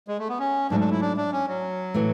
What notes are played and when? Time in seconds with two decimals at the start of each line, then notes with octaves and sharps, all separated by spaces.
0.08 G#3
0.19 A3
0.29 B3
0.39 C#4
0.70 G#2 F#3 A3 D4
0.80 D4
0.91 E4
1.01 D4
1.17 D4
1.32 C#4
1.48 F#3
1.94 A2 E3 A3